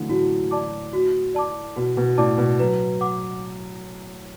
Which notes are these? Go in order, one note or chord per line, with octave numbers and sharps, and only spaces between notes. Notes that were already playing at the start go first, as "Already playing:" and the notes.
Already playing: D3 E3 F#3 A3
A2 F#4
D5 A5 D6
F#4
D5 A5 D6
B2 F#4
B2
A2 D5 A5 D6
B2
F#3 B4
F#5 D6